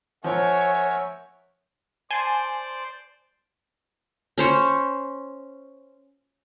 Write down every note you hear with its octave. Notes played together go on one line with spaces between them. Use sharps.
F3 A#4 C#5 E5 F#5 G#5
C5 D5 G#5 A5 C6
C#4 C5 C#5